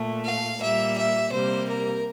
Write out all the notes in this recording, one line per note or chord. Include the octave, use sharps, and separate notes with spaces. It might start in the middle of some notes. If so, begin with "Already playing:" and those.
Already playing: A#2 A3
F5
A#2 G3 A#3 E5
E5
C3 G3 A#3 C5
A#4